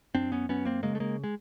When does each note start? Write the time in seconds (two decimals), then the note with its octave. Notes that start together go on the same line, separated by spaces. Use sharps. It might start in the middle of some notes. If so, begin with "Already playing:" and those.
0.15 F#2 C4 D4
0.32 B3 C#4
0.49 F#2 B3 C#4
0.65 A#3 C4
0.83 C#3 G#3 A#3
0.95 A3
1.00 G#3 A#3
1.24 G#3